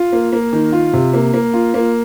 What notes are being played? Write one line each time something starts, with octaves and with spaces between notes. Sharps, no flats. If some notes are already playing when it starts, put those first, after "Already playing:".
Already playing: F4
A#3
A#3
D#3
F4
C3
A#3
A#3
F4
A#3